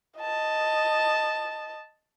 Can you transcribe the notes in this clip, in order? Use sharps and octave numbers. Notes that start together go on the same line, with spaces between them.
D#5 A5